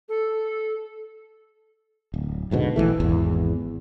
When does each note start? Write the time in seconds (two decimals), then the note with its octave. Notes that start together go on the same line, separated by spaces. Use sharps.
0.09 A4
2.14 D1
2.51 D#1 G#2 B2 D3
2.76 A#1 E2 E3 A3
3.00 G#1 E2